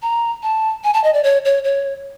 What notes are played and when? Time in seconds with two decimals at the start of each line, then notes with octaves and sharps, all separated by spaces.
0.02 A#5
0.43 A5
0.84 G#5
0.94 A5
1.04 D#5
1.14 D5
1.24 C#5
1.45 C#5
1.64 C#5